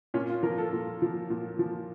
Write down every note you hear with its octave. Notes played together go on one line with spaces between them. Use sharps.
A#2 C#4
F4
F3 A#4
A4
A#2
F3
A#2
F3